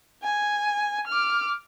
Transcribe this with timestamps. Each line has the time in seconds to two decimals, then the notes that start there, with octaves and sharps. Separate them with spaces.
0.23 G#5
1.07 D6 F6